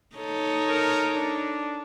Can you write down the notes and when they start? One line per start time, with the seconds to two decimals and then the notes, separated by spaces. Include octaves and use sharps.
0.17 D#4 A4 C#5
0.68 A#4
1.16 D4